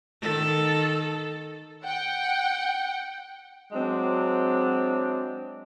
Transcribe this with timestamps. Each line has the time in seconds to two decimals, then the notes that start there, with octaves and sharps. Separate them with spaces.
0.22 D#3 A4
1.83 F#5 G5
3.72 F#3 G#3 C4 D4